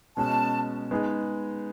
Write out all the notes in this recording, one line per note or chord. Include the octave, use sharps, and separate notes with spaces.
B2 G#3 C#4 A5
G#3 B3 D#4 G#4